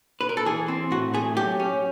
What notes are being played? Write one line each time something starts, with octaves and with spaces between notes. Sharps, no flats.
B4
A#4
A4
E3 G#4
C4
A2 F#4
A3 G#4
F#3 G4
C#4